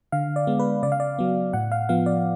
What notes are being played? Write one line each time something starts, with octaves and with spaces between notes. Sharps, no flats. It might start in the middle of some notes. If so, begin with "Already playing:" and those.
D3 F5
D5
G#3 B3
B4
C#3 D5
F5
D5
F#3 B3
A2 F#5
F5
F3 B3 F5
D5